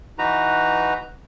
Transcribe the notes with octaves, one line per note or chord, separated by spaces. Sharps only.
E3 D#4 F#4 B4 A#5